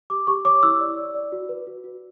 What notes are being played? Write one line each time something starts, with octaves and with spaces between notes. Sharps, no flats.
G4 D6
G4 C#6
C#5 D6
E4 E6
D5
D5
D5
F#4
B4
F#4
F#4